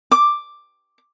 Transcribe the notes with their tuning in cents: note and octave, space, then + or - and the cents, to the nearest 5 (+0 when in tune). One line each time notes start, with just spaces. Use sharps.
D6 +5